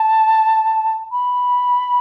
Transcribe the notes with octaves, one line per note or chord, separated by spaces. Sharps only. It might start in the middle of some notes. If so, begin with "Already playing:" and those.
Already playing: A5
B5